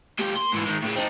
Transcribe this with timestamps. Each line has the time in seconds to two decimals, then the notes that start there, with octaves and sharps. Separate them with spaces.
0.19 C#2 G4
0.37 A#4 C6
0.53 G#2 E3
0.67 D#3 G#3
0.82 A2 C#3
0.96 C4 D#4